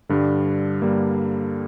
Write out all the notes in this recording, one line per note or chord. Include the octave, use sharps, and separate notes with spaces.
G2 D3 G3 D4
G2 G3 A#3